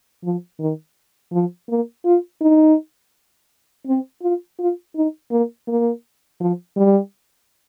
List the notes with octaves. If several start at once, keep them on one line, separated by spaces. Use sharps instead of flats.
F3
D#3
F3
A#3
F4
D#4
C4
F4
F4
D#4
A#3
A#3
F3
G3